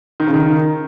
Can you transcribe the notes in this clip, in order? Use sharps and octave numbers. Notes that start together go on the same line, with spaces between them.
D#3
C#3
D#3